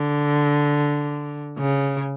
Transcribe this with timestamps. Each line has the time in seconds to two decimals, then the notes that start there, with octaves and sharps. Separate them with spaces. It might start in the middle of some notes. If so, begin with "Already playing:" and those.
Already playing: D3
1.58 C#3